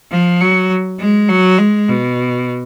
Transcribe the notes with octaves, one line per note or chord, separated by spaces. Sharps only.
F3
F#3
G#3
F#3
G#3
B2